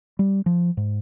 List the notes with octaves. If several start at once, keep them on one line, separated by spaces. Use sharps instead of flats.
G3
F3
G#2